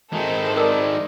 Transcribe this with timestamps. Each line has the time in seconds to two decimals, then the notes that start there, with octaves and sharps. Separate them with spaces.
0.12 D#3 G#3 C4 E4 A4
0.57 A#4 D5 D#6 E6